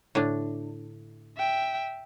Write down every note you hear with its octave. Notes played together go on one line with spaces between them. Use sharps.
A2 D3 D4
E5 G5